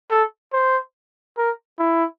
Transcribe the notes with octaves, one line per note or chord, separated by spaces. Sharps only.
A4
C5
A#4
E4